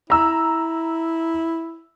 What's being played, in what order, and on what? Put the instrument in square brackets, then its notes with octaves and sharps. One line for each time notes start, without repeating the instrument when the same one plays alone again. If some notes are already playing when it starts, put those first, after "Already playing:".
[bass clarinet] E4 [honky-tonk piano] A#5 E6